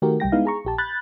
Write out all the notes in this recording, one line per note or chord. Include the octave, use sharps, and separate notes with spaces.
D#3 A3 F#4 G4 A#4
C2 G3 G5 A#6
G#3 B3 D#4 E4 F5
G#4 A#5 C#6
A#1 G4 A5
B5 F#6 G6 A6